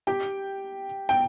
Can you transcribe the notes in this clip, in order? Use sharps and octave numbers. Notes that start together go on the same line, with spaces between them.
G4 G5
G5